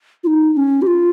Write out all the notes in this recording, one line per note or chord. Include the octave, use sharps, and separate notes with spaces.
F4
D#4
D#4
C#4
G4
F4